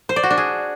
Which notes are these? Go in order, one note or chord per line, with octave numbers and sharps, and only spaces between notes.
C5
D5
F#4
D4
G#4